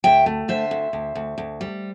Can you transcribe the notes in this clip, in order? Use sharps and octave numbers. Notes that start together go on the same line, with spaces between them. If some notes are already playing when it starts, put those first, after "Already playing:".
D2 E5 G5
A3
D3 C5 E5
D2
D2
D2
D2
G3